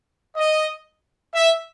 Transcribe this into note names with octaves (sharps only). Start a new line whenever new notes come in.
D#5
E5